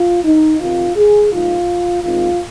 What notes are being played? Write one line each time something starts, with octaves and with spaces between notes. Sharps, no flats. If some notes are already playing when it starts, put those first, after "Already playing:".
Already playing: F4
D#4
C3 D#3 C4 D#4 F4
G#4
A#2 F3 G#3 D#4 F4
D#2 D#3 G#3 C4 F4